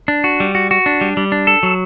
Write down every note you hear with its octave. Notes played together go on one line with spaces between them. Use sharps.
D4
F#4
G3
F#4
F#4
D4
G3
G3
D4
A4
F#3